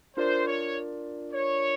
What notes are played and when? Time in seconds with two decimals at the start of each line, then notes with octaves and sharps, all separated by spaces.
0.17 D4 F4 A#4 C5 D5
0.46 C#5
1.32 C#5